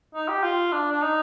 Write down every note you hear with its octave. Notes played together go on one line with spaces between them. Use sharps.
D#4
G4
F4
D4
D4
D#4